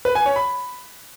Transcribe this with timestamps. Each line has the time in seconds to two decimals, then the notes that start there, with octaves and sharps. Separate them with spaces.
0.05 B4
0.15 G#5
0.26 C#5
0.36 B5